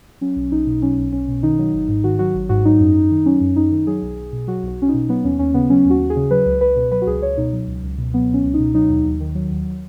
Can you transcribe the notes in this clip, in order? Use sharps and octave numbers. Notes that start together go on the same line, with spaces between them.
F#3 C#4
B1
B1 D#4
B2
F#3 C#4
B1
B1 C#4
B2
D#3 D#4
F#3
G#1
G#2
D#3 F#4
F#3 F#4
G#1
G#2 F#4
F#3 D#4
F#2
F#2
D#3
F#3 C#4
F#2
F#2 D#4
D#3
F#3 G#4
B1
B1
B2
F#3 F#4
B1 F#4
B1 C#4
D#4
B2
F#3 B3
D#2 C#4
D#2 C#4
C#3 B3
F#3 C#4
D#2
F#4
D#2
G#4
C#3
F#3 B4
C#2
C#2 B4
B2
F#3 B4
F#4
C#2 G#4
C#2 C#5
B2 D#4
F#3
C#2
C#2
B2
F#3 B3
C#2
C#4
C#2
D#4
B2
F#3 D#4
D#2
D#2
D#3
F#3
D#2